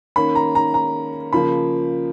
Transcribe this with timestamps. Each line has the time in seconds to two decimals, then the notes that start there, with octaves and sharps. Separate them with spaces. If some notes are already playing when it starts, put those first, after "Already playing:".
0.16 D#3 A#3 C#4 B5
0.35 A#5
0.55 A#5
0.74 A#5
1.33 C#3 F3 A#3 B5